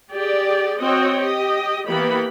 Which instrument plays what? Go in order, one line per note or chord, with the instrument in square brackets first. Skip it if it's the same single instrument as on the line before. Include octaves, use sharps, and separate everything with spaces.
[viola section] G4 G#4 D5
C4 F#4 C#5 D#5 G5
G4 D#5
E3 A#3 B3 G4 B5